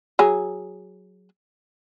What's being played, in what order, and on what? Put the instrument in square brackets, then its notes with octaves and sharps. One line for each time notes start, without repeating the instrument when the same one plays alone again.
[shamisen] F#3 G#4